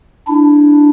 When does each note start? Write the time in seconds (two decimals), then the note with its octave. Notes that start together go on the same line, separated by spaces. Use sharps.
0.28 D4 E4